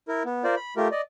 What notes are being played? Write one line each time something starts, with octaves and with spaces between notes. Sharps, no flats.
E4 A#4
B3
F4 A#4 C5 D5
B5
A3 F4 G4 A#4
D5 D#5